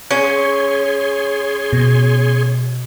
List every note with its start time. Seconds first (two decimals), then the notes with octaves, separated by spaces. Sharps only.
0.11 C#4 G#4 C#5 C6
1.73 B2